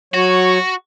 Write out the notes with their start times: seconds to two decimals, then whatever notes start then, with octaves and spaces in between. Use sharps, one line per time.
0.14 F#3 F#4 C#5